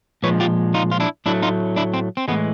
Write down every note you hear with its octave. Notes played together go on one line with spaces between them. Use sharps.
A#2 F3 G#3 B4 C#5
F4 G4
D#4 F4
F4
D4 E4
A2 F#3 A3 D4 E4
D#4 F4
D4 E4
C4
C4
A2 E3 G#3 B3